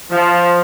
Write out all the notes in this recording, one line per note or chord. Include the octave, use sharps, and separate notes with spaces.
F3